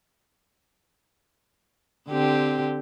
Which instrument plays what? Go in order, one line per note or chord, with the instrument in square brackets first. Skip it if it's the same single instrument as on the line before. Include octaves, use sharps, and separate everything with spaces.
[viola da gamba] D3 C4 G4